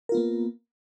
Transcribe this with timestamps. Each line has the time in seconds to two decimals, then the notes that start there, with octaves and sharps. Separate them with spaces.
0.09 A#4
0.12 F4
0.15 B3
0.17 A#3